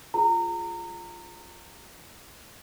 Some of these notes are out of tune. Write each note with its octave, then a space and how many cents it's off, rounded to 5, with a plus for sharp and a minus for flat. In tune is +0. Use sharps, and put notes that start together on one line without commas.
F4 +0 G#4 +0 A#5 -25